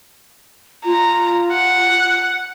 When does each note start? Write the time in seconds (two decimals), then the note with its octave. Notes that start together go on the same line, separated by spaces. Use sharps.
0.85 F4 A#5
1.52 F#5